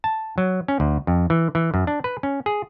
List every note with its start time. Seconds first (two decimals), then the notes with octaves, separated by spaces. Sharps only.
0.04 A5
0.38 F#3
0.68 C#4
0.80 D2
1.07 F2
1.30 E3
1.55 E3
1.74 F#2
1.87 D4
2.04 B4
2.23 C#4
2.46 G#4